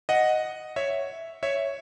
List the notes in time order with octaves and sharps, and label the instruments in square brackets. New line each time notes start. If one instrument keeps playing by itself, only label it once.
[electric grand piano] D#5 F#5
C#5 E5
C#5 E5